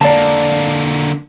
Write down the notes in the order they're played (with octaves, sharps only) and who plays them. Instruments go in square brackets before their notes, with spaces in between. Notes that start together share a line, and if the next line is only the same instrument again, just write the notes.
[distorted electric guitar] D3 A#3 [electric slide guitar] D5 A5